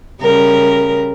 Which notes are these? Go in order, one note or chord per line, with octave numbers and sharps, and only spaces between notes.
C#3 G3 A#4